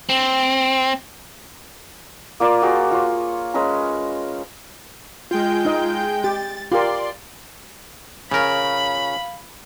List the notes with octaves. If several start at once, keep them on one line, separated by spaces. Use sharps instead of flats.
C4
A#3 F4 D5
F#4 G#4 C5 A#5
F4 C#5
G#3 C#4 B4 A#5
G#3 F4 G5 G6
D#4 D#5
G4 A6
F4 G4 A#4 D5 C6
C#3 F4 A#4 C#5 F5 B5